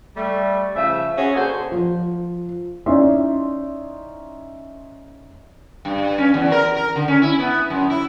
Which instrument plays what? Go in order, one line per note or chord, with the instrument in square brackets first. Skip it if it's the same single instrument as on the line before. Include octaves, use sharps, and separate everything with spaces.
[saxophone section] G3 A3
C#3 F3 E5
C#4 F#4 G#4
D3 A#3 F#4 A4 C5
[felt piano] F3
[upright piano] C#4 D#4 E4 D5 E5 C6
[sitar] G2
C#4
E2
A#4
A#4
D3
C#4
E4
B3
F#2
E4